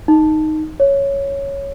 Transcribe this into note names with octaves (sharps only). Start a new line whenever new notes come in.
D#4
C#5